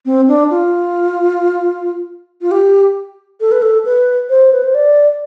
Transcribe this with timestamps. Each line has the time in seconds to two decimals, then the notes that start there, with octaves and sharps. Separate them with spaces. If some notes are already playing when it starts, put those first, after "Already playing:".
0.06 C4
0.28 D4
0.50 F4
2.41 F4
2.51 G4
3.41 A4
3.52 B4
3.62 A4
3.85 B4
4.30 C5
4.53 B4
4.64 C5
4.75 D5